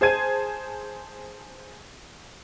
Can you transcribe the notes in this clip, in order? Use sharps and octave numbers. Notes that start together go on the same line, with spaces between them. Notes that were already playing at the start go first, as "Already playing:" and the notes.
G#4 C5 A5 G#6 D#7